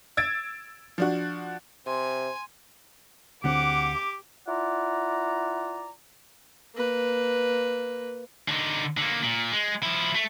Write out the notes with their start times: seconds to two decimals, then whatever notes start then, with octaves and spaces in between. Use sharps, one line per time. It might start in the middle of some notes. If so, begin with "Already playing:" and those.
0.17 E6 G#6 A6 D7
0.98 F3 D4 F#4
1.87 C3 C5 G#5 C6
3.44 D2 D3 C4 G4 F#5 D6
4.48 E4 F4 D5 F#5 A#5
6.76 A#3 B4
8.48 D3 D#4
8.97 D3 A#3
9.23 A#2
9.52 G#3
9.83 F3 E4
10.15 A3